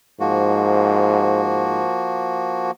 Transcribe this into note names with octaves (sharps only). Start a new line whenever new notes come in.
G#2 F3 A#3 F#4